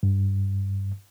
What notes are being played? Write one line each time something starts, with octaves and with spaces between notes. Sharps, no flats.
G2